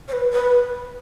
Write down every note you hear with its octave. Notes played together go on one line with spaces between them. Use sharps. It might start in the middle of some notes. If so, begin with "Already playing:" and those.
C#5
B4
B4